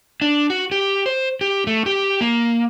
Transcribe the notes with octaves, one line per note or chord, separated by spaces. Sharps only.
D4
F#4
G4
C5
G4
A3
G4
A#3